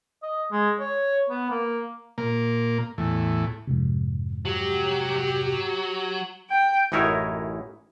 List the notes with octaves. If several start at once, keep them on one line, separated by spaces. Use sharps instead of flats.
D#5
G#3
C#5
B3
A#3
A#2 A#3
E2 A2
F2 G#2 C3
F#3 G4
F#3
G5
A1 F#2 D#4 E4 A#4 C#5